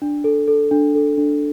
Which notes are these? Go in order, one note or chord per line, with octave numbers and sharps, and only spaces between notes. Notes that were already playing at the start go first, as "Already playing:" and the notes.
D4
A4
A4
D4
A4
D4